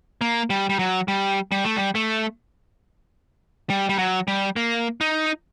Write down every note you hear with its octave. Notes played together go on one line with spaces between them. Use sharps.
A#3
G3
G3
F#3
G3
G3
A3
G3
A3
G3
G3
F#3
G3
A#3
D#4